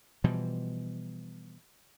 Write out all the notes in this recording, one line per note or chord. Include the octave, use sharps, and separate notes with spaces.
B2 E3 F3 G3